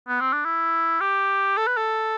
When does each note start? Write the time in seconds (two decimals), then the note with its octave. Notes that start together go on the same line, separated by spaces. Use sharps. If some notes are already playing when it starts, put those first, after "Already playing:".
0.08 B3
0.21 C4
0.33 D4
0.45 E4
1.01 G4
1.57 A4
1.67 B4
1.77 A4